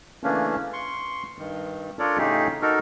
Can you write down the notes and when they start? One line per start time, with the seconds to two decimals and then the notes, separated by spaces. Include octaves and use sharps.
0.24 C#3 E3 A3 A#3 C#4 D4
0.73 C6 C#6
1.39 G2 D#3
1.99 D4 F4 A4 A#4 C#5 D5
2.18 A2 C#3 A3 D#4 G4 G#4
2.62 D#4 F#4 A4 A#4